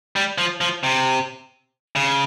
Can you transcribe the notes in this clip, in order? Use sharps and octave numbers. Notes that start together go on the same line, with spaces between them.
G3
F3
F3
C3
C#3